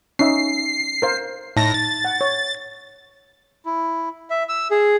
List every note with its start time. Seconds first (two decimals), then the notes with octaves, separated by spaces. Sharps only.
0.19 C#4 D#4 E5 C7
1.02 A#4 C5 F5
1.57 A2 D#4 A5 A#6
1.74 A6
2.05 F#5
2.21 C#5
3.66 E4
4.30 E5
4.49 E6
4.71 G#4